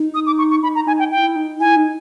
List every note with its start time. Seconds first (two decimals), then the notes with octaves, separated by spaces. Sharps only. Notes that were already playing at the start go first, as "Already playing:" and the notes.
Already playing: D#4
0.14 D#6
0.26 D6
0.38 C#6
0.50 C#6
0.63 D#4 B5
0.75 A#5
0.87 D#4 G#5
0.99 G5
1.11 E4 G5
1.36 D#4
1.60 E4 G#5
1.76 D#4